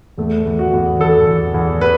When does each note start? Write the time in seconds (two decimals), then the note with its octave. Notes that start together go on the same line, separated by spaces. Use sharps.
0.18 E2 A3
0.46 E2
0.59 F#4
0.73 E2
0.99 E2 A4
1.27 E2
1.54 E2
1.81 B4